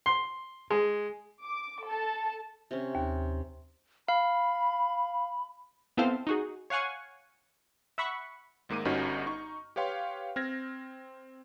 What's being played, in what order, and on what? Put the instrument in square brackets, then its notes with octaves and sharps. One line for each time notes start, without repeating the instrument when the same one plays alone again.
[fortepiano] C6
G#3
[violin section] D6
A4 A5
[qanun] C3 C#4
[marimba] D#2
[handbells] F5 [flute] B5
[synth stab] B3 C4 E4 A4 C5 F5
D#4 F#4 G#4
C#5 F5 F#5 G#5 C#6
E5 F#5 B5 C#6
[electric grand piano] G#1 G#2 A#3 D6 D#7
G1 G2 C#4 D#4 F#4 F6
D#4 C#6
G4 B4 C#5 F5 G5 C6
C4 F6 G#6 A#6